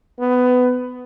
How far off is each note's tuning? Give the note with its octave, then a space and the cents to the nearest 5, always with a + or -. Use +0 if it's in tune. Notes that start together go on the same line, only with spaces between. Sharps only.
B3 +15